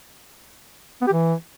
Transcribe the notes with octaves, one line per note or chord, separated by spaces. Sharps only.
B3
G4
E3